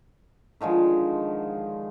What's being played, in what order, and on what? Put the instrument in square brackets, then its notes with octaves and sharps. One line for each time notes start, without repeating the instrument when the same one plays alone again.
[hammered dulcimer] D3 D#3 F3 G#3